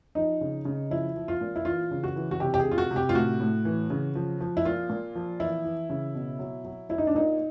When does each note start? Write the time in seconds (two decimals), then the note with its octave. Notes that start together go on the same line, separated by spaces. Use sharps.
0.15 F3 D#4
0.41 C#3
0.65 C#3
0.90 F3 E4
1.16 F3
1.28 F4
1.41 A#2
1.56 E4
1.65 E3 F4
1.91 C#3
2.04 F#4
2.16 E3
2.31 F#4
2.40 C3 G4
2.54 G4
2.60 G#4
2.65 C3
2.71 F4
2.78 F#4
2.91 C3
2.96 G4
3.09 F4
3.15 A2 F#4
3.40 A2
3.65 E3
3.90 C#3
4.15 F3
4.41 F3
4.57 E4
4.65 A#2 F4
4.90 A#2
5.15 F3
5.40 E3 E4
5.64 E3
5.90 C#3
6.15 B2
6.39 F#3
6.65 F#3
6.89 F#3 E4
6.98 D#4
7.07 D4
7.15 A#2 D#4